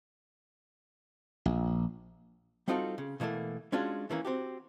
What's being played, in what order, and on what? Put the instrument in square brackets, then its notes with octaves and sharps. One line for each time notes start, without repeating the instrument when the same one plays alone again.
[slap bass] A#1
[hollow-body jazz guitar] G3 C4 D#4 F4 F#4 A4
C#3
B2 E3 F3 A3 A#3
G#3 C#4 D4 F4 F#4 C#5
D#3 E3 A#3 C#4
C4 F#4 G4